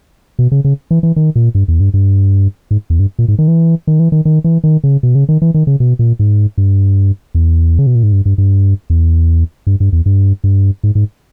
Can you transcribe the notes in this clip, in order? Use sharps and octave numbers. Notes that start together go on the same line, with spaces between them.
B2
C#3
C#3
E3
E3
D#3
A#2
G2
E2
G2
G2
G#2
E2
G2
A#2
G#2
D#3
E3
D#3
E3
D#3
D#3
E3
D#3
C#3
B2
C#3
D#3
E3
D#3
C#3
B2
A#2
G#2
G2
E2
C#3
B2
A#2
G#2
G2
G2
G2
E2
G2
G2
E2
G2
G2
G#2
G#2